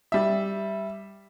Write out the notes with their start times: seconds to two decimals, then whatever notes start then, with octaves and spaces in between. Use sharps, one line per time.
0.12 G3 E5